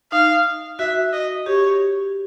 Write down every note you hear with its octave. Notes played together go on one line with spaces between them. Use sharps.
D#4 F5
F#4 E5
D#5
G4 C#5